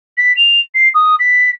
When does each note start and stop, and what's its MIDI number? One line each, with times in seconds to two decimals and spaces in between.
0.17 0.35 95
0.36 0.60 101
0.74 0.89 96
0.94 1.15 87
1.19 1.50 95